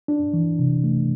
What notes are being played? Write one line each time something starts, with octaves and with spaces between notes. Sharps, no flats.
D4
E3
C3
A3